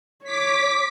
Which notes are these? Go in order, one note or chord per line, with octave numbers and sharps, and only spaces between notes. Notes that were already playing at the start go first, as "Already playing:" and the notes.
C#5 D6 B6